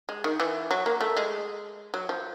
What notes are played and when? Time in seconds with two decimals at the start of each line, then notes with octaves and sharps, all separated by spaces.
0.09 G#3
0.24 D#3
0.40 E3
0.71 F#3
0.86 A#3
1.01 A3
1.17 G#3
1.94 F#3
2.09 F3